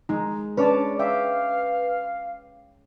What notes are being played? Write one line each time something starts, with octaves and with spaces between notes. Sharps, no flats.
G#3 D#4
C#4 D4 B4 C#5 D5 A5 D6
E5 F5 G5 D6